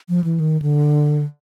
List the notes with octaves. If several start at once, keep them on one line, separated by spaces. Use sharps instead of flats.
F3
E3
D#3
D3